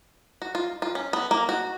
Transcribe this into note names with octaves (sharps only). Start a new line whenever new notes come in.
F#4
F4
F4
C#4
B3
A#3
F#4